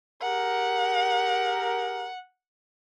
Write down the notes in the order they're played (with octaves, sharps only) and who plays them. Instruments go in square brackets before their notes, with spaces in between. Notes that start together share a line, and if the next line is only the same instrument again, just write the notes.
[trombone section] G4 G#4 A#4 [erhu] F#5